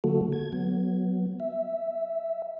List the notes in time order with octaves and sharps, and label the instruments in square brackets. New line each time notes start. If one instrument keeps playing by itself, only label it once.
[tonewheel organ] D3 F#3 A3 A#3 F#4 A4
G#6
F#3 B3
E5